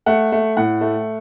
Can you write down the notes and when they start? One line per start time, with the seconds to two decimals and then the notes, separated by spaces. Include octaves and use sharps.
0.06 A3 F#5
0.32 A3
0.57 A2 F#5
0.81 A3